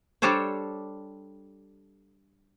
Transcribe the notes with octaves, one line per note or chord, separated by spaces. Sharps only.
G3 D4 G4 A4 C5 C#5